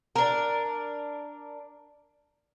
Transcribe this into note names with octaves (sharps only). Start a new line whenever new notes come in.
D4 A#4